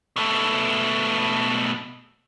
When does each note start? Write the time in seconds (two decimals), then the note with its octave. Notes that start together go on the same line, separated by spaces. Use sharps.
0.16 B2 A3